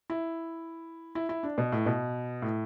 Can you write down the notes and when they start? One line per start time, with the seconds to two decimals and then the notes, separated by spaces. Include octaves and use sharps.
0.10 E4
1.15 E4
1.29 E4
1.43 D4
1.58 B2
1.72 A2
1.86 B2
2.42 A2